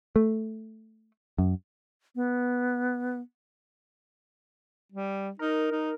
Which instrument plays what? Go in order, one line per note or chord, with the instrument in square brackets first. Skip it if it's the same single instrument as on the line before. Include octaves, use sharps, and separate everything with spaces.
[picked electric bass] A3
F#2
[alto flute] B3
[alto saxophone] G3
[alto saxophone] D#4 [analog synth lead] A#4
[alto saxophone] D#4